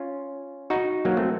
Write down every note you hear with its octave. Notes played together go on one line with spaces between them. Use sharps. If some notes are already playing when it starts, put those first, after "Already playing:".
Already playing: C#4 F4
D#4 F#4
F#3 A#3
A3 C4